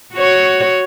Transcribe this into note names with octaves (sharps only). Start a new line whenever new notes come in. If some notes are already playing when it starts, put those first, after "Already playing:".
F#4 C#5